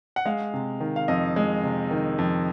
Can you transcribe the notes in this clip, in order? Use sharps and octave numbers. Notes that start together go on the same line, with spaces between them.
F#5
G#3 F5
C3
D#3
F5
F2 D#5
G#3
C3
D#3
F2